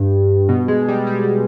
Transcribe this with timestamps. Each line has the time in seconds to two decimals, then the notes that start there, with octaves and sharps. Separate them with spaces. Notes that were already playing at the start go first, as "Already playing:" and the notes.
Already playing: G2
0.49 B2
0.68 G#3
0.88 G3
1.07 G3